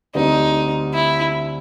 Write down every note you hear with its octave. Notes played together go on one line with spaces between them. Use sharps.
D2 D3 G3 C4 D#4
E4